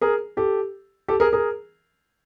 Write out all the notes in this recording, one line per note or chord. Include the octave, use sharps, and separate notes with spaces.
G#4 A#4
G4 A4
G4 A4
G#4 A#4
G#4 A#4